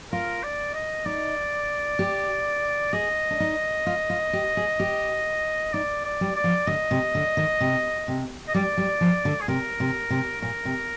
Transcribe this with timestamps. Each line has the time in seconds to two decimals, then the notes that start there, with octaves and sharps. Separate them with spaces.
0.12 F4 A#4
0.43 D5
0.74 D#5
1.06 D#4 D5
1.99 G4
2.93 G#4 D#5
3.31 D4
3.40 D#4
3.87 F4
4.10 F4
4.33 G4
4.57 G#4
4.80 G4
5.73 D#4 D5
6.05 D5
6.21 G3
6.36 D5
6.44 F3
6.67 D3 D#5
6.91 C3
7.15 D3
7.37 D#3
7.61 C3
8.08 C3
8.48 D#5
8.54 G3 D5
8.77 G3
9.01 F3
9.25 D3
9.41 G#4
9.48 C3 A#4
9.80 C3
10.10 C3
10.41 A#2 A#4
10.65 C3